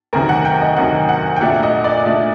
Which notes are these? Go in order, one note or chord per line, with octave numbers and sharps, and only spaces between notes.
D2 C3 D#3 F#3 A#4
F#5
G5
D#5
D2 C3 D#3 F#3 F#5
F#5
G5
A#2 A3 D4 F#5
D#5
D5
A#2 A3 D4